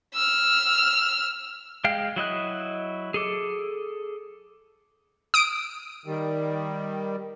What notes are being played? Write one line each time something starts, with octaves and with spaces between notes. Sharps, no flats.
E6 F6
G#3 F5 G5
F#3 E4 D#5 F#6
G#4 A4 D6
D#6 D7
D#3 G3